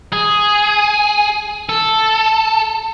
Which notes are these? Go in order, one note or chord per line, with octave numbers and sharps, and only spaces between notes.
G#4
A4